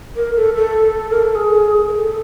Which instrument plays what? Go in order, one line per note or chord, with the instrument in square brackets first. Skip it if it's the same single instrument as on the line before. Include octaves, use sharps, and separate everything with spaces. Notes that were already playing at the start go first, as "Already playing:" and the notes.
[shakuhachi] A#4
A4
A4
A#4
A4
G#4
A#4
A4